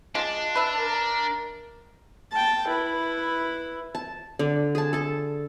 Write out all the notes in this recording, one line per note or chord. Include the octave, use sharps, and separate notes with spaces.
G#3 D4 F4 A5
B4 E5
A#4
G5 A5
E4 B4
A5
D3
G#4 A5
A4 A5